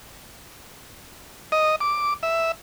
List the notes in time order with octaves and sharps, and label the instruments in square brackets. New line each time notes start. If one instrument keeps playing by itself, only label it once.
[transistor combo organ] D#5
D6
E5